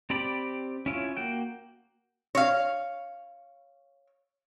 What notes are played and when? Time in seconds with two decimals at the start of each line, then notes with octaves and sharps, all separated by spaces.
0.10 C4 G4 D5 B5
0.86 C#4 E4 F4 C#5
1.17 A#3 F#4 G5
2.35 C#5 F5